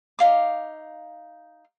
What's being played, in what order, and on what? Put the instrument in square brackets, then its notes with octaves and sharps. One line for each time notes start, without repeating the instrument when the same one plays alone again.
[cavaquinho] D#4 F5 D6